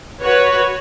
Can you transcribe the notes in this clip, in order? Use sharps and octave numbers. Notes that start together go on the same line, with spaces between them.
F#4 B4 C#5